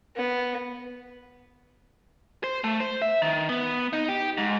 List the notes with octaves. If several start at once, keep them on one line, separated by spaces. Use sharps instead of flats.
B3
C5
A3
C5
E5
D#3
B3
D#4
G4
G#2